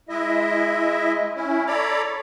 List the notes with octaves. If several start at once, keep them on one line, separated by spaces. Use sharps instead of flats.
G#3 E4 D#5 E5
C#4 E4
A4 C#5 D5 A#5 B5 D6